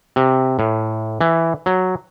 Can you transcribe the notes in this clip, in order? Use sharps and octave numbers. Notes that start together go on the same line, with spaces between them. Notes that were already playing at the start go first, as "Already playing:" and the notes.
C3
A2
E3
F#3